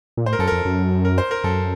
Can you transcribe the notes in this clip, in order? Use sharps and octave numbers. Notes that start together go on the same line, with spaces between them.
A#2
A2 C5
A#4
F#2 A4
F2 A#4
F#2
A#4
C5
A#4
F#2 A4